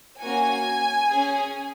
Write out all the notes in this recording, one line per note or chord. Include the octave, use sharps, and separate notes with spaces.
A#3 C#4 F#4 G#5
C#4 G#4